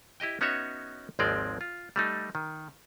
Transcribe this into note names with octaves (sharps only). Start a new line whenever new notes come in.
E4 G4 D#5 G5
B3 C#4 D#4 F#4 C#5 E5
G#1 D#2 F3 G#3 C4 D5
F4
G3 A3 D#4
D#3